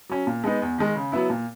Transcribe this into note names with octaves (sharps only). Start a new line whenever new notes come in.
F#3 C#4
A#2
G#3 B3 D#4
E2
D#3 G#3
C#3
F#3 B3 E4
A#2